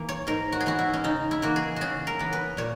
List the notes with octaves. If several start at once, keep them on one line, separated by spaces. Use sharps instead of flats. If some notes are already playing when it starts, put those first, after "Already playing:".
Already playing: E3 A#3
C#5
G#2 A#4
F#4
G#4
E3 B3 F#4
E4
C#4
C#3 D#4
E4
E3 A#3 F#4
G#4
C#3 F#4 G#4
A#4
E3 B3
B4
A#2 C#5